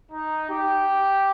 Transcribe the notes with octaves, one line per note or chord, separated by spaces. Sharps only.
D#4
G4